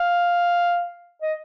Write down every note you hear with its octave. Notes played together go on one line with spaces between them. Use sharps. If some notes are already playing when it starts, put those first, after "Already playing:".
Already playing: F5
D#5